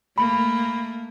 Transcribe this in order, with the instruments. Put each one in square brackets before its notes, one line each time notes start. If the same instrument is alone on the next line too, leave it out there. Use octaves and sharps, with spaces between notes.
[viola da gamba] A3 A#3 [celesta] B5